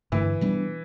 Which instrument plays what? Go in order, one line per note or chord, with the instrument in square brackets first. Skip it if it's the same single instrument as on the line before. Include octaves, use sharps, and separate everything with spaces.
[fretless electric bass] G2 D3 A3 [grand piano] E3
[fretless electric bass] B2 G3 B3 D4